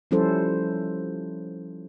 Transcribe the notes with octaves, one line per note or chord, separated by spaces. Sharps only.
F3 G3 C#4 E4 A4 C5